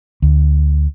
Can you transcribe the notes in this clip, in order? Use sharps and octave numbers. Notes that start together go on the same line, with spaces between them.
D2